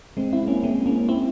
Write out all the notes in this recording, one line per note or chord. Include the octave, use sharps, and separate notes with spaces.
G#3 C4
C4 E4
A#3 C#4
G#3 C4
A#3 C#4
C4 E4